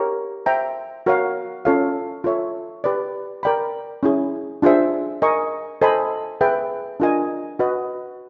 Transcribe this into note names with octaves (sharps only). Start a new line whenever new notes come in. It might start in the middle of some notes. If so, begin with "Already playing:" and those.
Already playing: G4 A#4 C#5
C5 E5 G5 A#5
F#4 A#4 C#5 F5
C#4 F4 A4 C#5 F5
F4 A4 C#5 E5
G4 B4 D5
A#4 D5 G5 B5
C#4 E4 G#4
D4 F4 G#4 C5 E5
A#4 D#5 G#5 C#6
A4 C5 D#5 G#5 B5
G#4 B4 E5 G5
D4 F4 A#4 D#5 G#5
F#4 B4 D#5